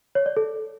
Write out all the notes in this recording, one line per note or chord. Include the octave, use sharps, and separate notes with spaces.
C#5
D5
A4